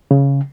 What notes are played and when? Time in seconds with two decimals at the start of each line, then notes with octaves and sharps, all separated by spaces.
0.11 C#3